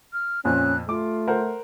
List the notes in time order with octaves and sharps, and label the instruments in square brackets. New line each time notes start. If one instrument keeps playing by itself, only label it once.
[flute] F6
[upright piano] F2 A#2 C4 [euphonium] C#4 [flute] F#6
[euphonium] A3 [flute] F4 [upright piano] D6
[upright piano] A#4 C5 F#5